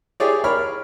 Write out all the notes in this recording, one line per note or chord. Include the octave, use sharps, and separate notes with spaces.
E4 G4 G#4 C#5 D5
A#4 C#5 B5 F6